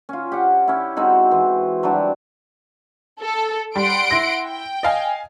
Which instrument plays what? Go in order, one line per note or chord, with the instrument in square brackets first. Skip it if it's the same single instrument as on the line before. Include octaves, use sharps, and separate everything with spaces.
[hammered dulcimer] C#4 F4
G4 F#5
C#4 E4
G#3 C4 D#4 F#4
E3
F#3 G3 D4 G4
[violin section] A4
[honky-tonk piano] G3 [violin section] F#5 C6 D7
[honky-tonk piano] E4 A#6
[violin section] G5
[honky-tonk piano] D#5 F5 G#5